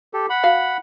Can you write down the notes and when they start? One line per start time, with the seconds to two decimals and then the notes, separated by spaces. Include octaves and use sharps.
0.14 G4 A4
0.30 F#5 B5
0.44 F#4 F5